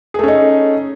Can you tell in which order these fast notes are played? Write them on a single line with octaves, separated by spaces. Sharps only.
G#4 A3 C#4 D#4